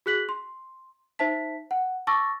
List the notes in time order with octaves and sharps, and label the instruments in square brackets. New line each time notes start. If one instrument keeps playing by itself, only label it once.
[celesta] F#4 G#4 F#6 B6 F#7
C6
D#4 C5 E5 A5 B6
F#5
A5 C#6 D6 E6 A6 A#6